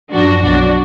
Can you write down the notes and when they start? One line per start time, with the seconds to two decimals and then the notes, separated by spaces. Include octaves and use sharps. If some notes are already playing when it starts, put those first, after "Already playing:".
0.11 F#2 F3 D4 F#4
0.42 B1 B2 F#3 D4 F#4